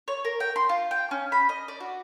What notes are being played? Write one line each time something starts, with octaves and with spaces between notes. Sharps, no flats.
C#5
A#4
G5
C6
F4
G5
C#4
B5
D#5
D5
F#4